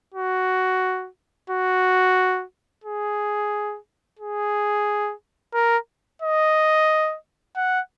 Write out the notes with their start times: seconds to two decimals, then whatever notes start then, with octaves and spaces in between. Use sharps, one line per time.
0.14 F#4
1.50 F#4
2.84 G#4
4.19 G#4
5.54 A#4
6.22 D#5
7.56 F#5